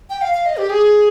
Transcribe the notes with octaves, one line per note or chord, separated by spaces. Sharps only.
G5
F5
F5
D#5
G4
G#4